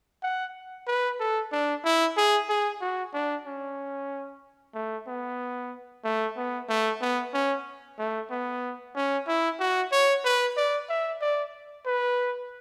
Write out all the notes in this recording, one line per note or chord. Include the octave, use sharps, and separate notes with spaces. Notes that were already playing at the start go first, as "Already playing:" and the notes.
F#5
B4
A4
D4
E4
G#4
G#4
F#4
D4
C#4
A3
B3
A3
B3
A3
B3
C#4
A3
B3
C#4
E4
F#4
C#5
B4
D5
E5
D5
B4